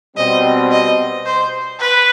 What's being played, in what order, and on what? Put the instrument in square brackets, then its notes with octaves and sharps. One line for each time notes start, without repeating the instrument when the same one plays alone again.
[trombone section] B2 G3 C4 [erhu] D#5
[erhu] D#5
C5
B4